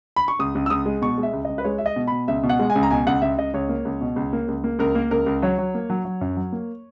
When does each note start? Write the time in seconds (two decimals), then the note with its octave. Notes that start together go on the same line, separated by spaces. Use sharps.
0.16 B5
0.28 C#6
0.39 C#2 D#6
0.55 C#2
0.66 E6
0.70 C#2 D#6
0.86 G#3
1.02 B2 C#6
1.18 G#3
1.23 E5
1.33 C#2
1.45 C#2 D#5
1.58 B4
1.64 G#3 C#5
1.78 G#3 E5
1.86 D#5
1.96 B2
2.07 B2 B5
2.28 C#2 E5
2.43 B2
2.49 F#5
2.60 G#3
2.70 G#5
2.75 C#2
2.83 A#5
2.91 B2 G#5
3.07 C#2 F#5
3.22 C#2 E5
3.38 C#2 D#5
3.54 C#2 C#5
3.69 A#3
3.85 C#2
4.01 B2
4.16 C#2
4.33 A#3
4.48 C#2
4.64 A#3
4.79 C#2 A#4
4.95 A#3
5.11 C#2 A#4
5.26 C#2
5.42 F#3 C#5
5.58 F#3
5.75 A#3
5.90 F#3
6.05 F#3
6.21 F#2
6.37 F#3
6.52 A#3